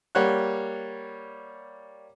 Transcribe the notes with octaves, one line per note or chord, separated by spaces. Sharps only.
G3 A#3 C#5 F#5 F#6